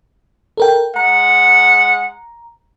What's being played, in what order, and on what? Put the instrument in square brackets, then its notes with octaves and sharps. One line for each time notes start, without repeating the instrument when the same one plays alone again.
[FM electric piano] A4 A#4 G5
[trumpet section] G#3 F#5 [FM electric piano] A#5